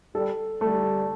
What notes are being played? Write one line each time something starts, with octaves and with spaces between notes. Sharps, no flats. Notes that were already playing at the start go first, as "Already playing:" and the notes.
G3 A4
G3 A3